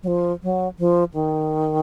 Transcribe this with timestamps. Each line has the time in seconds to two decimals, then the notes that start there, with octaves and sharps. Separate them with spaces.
0.03 F#3
0.08 F3
0.43 F#3
0.79 F3
1.14 D#3